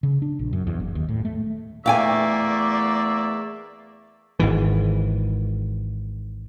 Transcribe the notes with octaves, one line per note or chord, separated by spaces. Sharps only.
C#3
D4
A#1
F#2
E2
F#1
D#2
A2
A3
E2 A3 A#3 D5 E5 F5 G5 G#5
G#1 G#2 E3